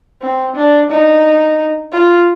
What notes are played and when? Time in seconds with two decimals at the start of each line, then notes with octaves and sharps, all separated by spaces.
0.21 C4
0.55 D4
0.90 D#4
1.92 F4